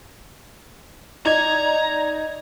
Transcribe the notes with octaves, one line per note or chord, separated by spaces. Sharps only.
D#4 D5 A#5 G#6